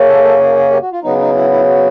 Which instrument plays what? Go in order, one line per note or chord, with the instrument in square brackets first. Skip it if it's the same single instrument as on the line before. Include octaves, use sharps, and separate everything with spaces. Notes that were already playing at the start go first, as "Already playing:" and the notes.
Already playing: [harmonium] F#2 C#3 F#3 A#3 C#4
A4
A4
G#4
G#4
G4
F#4
F4
C#3 F#3 B3 D#4
D#4
E4
E4
F#4